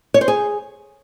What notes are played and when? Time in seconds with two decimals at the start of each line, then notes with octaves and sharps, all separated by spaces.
0.14 C#5
0.21 C5
0.28 G#4